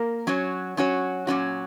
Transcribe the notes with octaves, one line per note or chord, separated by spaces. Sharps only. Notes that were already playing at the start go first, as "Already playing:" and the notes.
Already playing: A#3 A#4
F#3 C#4 F#4 C#5
F#3 C#4 F#4 C#5
A#2 F#3 C#4 F#4